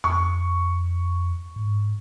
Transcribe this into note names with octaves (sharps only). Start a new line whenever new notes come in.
F2 C#6
G#2